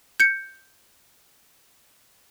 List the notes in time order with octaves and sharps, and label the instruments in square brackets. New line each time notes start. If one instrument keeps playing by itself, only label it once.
[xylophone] G6 C#7